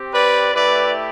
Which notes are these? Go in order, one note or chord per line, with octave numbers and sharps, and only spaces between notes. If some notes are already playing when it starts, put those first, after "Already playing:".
Already playing: C4 G4
B4 D5
A3 E4 G4 B4 D5